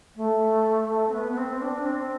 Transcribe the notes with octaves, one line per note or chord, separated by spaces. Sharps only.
A3
C4
B3
B3
C4
C4
D4
C4